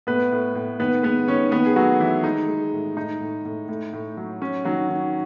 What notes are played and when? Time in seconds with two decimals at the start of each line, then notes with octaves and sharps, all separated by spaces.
0.07 A2 B3 B4
0.32 A2
0.55 A2
0.79 D#3 B3 B4
1.03 G#3 B3 B4
1.27 D#3 C#4 C#5
1.51 D#3 B3 B4
1.66 G#4
1.76 F#3 A3 F#4
2.00 D#3 E3 E4
2.24 G#3 D#4
2.48 G#3
2.73 A2
2.96 A2 D#4
3.21 A2
3.45 A2
3.69 A2
3.93 A2
4.17 F#3
4.41 F#3 C#4
4.65 D#3 F#3 F#4
4.89 D#3